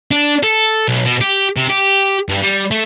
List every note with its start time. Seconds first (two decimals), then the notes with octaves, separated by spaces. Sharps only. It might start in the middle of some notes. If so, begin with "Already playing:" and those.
0.11 D4
0.43 A4
0.88 B1
1.05 B2
1.21 G4
1.57 C3
1.70 G4
2.29 G2
2.43 G3
2.71 A3